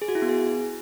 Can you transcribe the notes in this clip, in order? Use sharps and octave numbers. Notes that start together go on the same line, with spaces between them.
G#4
F#4
E4
B3
G#4